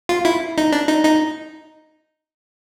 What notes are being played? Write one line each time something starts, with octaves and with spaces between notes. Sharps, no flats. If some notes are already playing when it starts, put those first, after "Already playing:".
F4
E4
D#4
D4
D#4
D#4